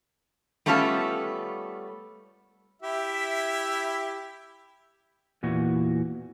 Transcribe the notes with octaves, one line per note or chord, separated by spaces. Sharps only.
G3 A3 B3 C#4 F4 A4
E4 G4 E5
E2 A#2 E3 F#4